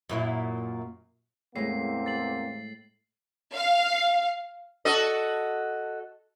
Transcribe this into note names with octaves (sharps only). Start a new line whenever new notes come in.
F#2 A#2 E4
E2 A2 G#3 A#3 C4 C7
A6 C7 F#7
F5
F#4 A4 D#5